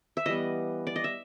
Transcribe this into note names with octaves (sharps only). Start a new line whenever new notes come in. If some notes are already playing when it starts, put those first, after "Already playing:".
E5
E3 G3 B3 D#5
D5
D#5
E5